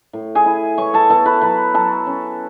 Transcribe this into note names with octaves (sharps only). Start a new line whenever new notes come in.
A2
G#4 G#5
E4
E3 C#5 C#6
A4 A5
B3 A4 A5
B4 B5
F#3 B4 B5
F#3 A4 A5
C#4